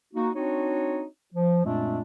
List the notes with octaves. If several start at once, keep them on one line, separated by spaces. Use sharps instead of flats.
A#3 D#4 F#4
C4 D4 D#4 F#4 C#5
F3
F#2 A#2 G#3 A3 C4 D4